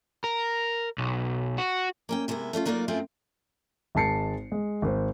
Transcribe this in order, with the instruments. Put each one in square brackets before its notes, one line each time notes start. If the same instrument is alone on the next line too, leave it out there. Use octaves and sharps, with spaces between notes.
[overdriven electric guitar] A#4
B1
F#4
[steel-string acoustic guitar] A#3 C#4 G5
C3 G#3 A#3 B3 E4
A3 C#4 D4 F4
F#3 A#3 D#4 F4 A#4 D5
F#2 A3 C4 F4 G5 G#5
[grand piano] G#1 G#3 A5 C7 C#7
G#3
G#1 C5